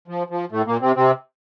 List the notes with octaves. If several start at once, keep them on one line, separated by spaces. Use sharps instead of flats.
F3
F3
A2 A3
A#2 A#3
C3 C4
C3 C4